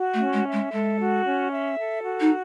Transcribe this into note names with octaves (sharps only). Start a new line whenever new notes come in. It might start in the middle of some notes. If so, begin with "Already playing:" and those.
Already playing: F#4
A3
C#4
G#3
E5
G#3
G#3 A4
F#4
C#4
E5
A4
F#4
D#4